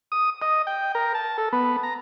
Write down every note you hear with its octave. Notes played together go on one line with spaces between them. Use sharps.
D#6
D#5
G5
A#4
A5
A4
B3
A#5